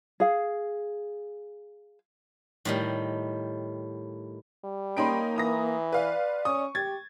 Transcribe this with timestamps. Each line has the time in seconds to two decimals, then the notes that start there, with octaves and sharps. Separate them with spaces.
0.20 G#4 F5
2.65 A2 D#3 G3
4.64 G3
4.97 A#3 C#4 D#4 G5 B5 C6 D7
5.36 E3 A#5 D#6 A#6
5.93 B4 D5 F5
6.45 C#4 C#6 D#6
6.75 G4 G#6 A6